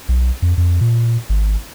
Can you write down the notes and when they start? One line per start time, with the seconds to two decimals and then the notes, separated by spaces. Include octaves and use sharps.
0.09 B1
0.42 F2
0.57 F2
0.81 A#2
1.29 G#1